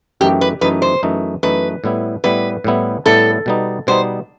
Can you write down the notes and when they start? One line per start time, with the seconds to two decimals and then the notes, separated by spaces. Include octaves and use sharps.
0.21 F#2 E3 A3 D#4 G4
0.41 B4
0.61 F#2 E3 A3 D#4 B4
0.82 C5
1.03 F#2 E3 A3 D#4
1.43 F#2 E3 A3 D#4 B4
1.84 A2 G3 B3 E4
2.24 A2 G3 B3 E4 B4
2.64 A2 G3 B3 E4
3.06 A2 G3 B3 E4 A4
3.46 B2 G3 B3 D#4
3.87 B2 G3 B3 D#4 C5